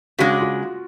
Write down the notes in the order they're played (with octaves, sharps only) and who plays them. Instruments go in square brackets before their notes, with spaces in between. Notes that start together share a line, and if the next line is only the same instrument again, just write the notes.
[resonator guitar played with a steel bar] C#3 G#3 D4 [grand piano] F#4
[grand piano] F4